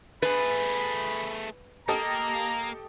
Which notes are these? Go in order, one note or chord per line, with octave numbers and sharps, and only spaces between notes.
A3 G#4 B4 B5
A#3 G4 A4 D#5 A#5